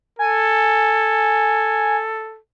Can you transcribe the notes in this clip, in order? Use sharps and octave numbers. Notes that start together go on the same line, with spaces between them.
A4 G#5